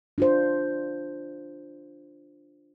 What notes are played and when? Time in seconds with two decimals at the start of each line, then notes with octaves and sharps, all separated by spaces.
0.18 D4 F4 C5